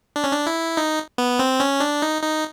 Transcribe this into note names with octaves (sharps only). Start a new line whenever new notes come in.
D4
C#4
D4
E4
D#4
B3
C4
C#4
D4
D#4
D#4